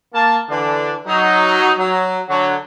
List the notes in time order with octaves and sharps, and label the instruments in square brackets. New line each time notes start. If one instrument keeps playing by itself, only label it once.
[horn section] A#3 A5
D3 E3 D4
F#3 D#4
F#3
D3 F#3